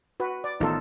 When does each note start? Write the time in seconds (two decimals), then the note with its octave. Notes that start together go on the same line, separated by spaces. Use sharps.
0.20 F#4 B4
0.44 D5
0.60 A1 D#3 B3 D#4 F4 A4